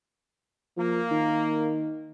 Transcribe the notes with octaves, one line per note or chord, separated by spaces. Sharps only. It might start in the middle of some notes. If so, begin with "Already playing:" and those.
F3 A#3
D#3